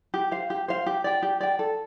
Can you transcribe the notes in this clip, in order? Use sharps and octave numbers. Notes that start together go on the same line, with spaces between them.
G4
C5 F5
G4
C5 F5
G4
D5 G5
G4
D5 G5
A4